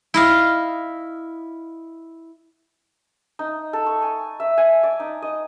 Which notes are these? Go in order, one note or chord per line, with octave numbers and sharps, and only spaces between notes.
E4 D#5 F5
D#4
A4
C#6
G#5
E5
G#5
D5
D#4
D#5